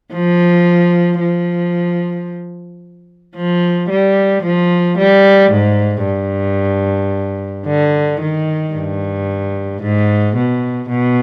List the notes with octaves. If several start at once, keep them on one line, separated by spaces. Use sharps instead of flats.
F3
F3
F3
G3
F3
G3
G#2
G2
D3
D#3
G2
G#2
B2
B2